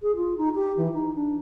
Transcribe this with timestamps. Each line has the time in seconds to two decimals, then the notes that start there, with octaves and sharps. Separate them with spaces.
0.02 G#4
0.15 F4
0.37 D#4
0.55 G4
0.76 E3
0.93 D#4
1.14 D4